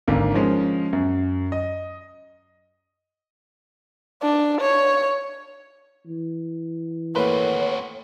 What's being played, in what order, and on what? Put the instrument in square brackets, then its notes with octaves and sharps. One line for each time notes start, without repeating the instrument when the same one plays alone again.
[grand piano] G#1 D3 A#3
F3 G#3 C#4
F#2
D#5
[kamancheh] D4
C#5
[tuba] E3
[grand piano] A3 A#3 B4 [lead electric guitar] C4 F#4 [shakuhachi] C#5